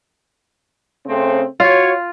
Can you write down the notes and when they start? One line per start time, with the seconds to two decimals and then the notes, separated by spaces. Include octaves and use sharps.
1.06 C#3 A3 C4
1.60 F4 F#4 C#5